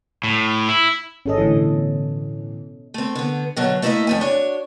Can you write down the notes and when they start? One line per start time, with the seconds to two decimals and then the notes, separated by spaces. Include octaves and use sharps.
0.24 A2
0.69 E4
1.26 G#1 C#4 G#4 A4 D#5
1.38 A2 D3 E3
1.56 B2
2.94 A3 C4
3.15 D3 B3
3.57 B2 D3 F#3
3.82 A3 A#3 E4 A#4 D#5 E5
4.07 F2 A3 G#5
4.21 D4 F#4 C#5